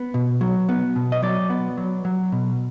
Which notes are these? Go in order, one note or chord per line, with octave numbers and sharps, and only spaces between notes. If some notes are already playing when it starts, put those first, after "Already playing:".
Already playing: B3
B2
F#3
B3
B2
D#5
F#3 D5
B3
F#3
F#3
B2